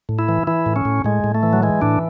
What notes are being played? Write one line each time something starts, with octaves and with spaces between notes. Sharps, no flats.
A2
E4
E3
E3 E4
A2
C#4
A2
A2 G#3
A2
A3
E3
F#3
E3 G#3
A2 D4